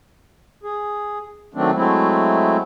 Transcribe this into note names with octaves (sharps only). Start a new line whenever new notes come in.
G#4
D#3 F#3 A3 C4 D4
F#3 G#3 A3 C4 E4